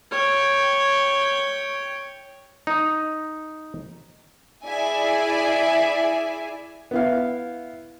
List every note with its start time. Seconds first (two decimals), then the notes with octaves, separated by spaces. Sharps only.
0.11 C#5 G5
2.67 D#4
4.65 E4 G#4 D5 E5 G#5
6.91 B3 E4 F5